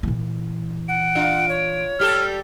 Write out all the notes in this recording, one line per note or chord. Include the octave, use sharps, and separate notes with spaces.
A#2 E3
F#5 D7
D4 F4
C#5
G3 G4 A4 F6